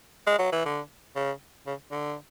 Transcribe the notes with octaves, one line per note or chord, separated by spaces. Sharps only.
G#3
F#3
E3
D3
C#3
C#3
D3